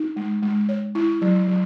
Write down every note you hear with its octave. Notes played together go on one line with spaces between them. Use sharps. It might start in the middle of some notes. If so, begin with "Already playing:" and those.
Already playing: D#4
G#3
G#3
C#5
E4
F#3
F#3